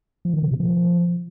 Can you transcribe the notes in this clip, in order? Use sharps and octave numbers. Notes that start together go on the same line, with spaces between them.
F3
D#3
C#3
B2
F3